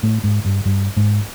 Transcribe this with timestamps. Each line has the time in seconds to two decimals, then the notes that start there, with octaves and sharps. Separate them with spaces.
0.03 A2 A3
0.24 G#2 G#3
0.45 G2 G3
0.65 G2 G3
0.97 G#2 G#3